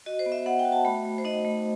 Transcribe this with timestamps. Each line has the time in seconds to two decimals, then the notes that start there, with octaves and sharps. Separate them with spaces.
0.06 F#4 D#5
0.19 C5
0.26 B3
0.32 E5
0.46 B3 F#5
0.59 G5
0.65 F#4
0.72 A5
0.85 A3 B5
1.05 A3
1.18 C5
1.25 D#4 D#5
1.45 A3